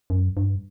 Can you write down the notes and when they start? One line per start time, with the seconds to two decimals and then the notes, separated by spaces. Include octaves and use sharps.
0.10 F#2
0.37 G2